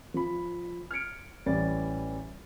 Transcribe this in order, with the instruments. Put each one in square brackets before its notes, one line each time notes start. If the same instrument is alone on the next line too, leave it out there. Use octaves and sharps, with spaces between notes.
[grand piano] F3 B5
F6 G#6 C#7 D7
A1 E3 G3 D5 A6